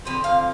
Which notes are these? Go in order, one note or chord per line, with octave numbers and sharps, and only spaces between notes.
D3 F3 C4 B4
F5